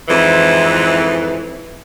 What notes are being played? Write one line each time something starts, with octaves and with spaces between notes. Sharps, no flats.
F2 G#2 E3